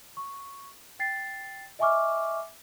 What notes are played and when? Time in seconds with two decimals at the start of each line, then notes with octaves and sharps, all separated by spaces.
0.17 C#6
0.99 G5 A6 C7
1.79 D#5 E5 G#5 C#6 D6 F6